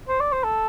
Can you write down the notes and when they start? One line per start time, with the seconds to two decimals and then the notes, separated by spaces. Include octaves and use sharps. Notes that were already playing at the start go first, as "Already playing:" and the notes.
0.09 C5
0.20 D5
0.32 C5
0.44 A4